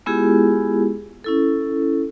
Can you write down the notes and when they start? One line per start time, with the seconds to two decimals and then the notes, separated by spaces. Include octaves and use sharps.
0.06 G#3 B3 E4 F4 G4 G#4
1.24 C#4 E4 A4